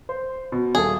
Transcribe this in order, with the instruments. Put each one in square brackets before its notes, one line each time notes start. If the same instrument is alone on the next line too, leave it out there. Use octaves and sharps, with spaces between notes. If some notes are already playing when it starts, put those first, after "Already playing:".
[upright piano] C5
B2
[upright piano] D#1 A4 [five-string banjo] G#4